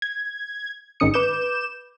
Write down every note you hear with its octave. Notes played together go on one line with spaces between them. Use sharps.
G#6
G#1 G#2 D#3 C#4 D#6 C#7
B4 D6 G6 E7